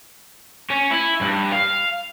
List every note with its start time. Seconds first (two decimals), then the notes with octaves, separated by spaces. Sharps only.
0.70 C#4
0.91 E4
1.21 G2
1.52 F5